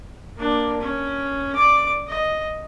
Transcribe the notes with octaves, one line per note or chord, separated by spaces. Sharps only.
A#3 D4
C#4
D5 D6
D#5